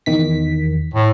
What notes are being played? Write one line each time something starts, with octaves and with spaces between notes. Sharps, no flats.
E2 D#3 B6
A2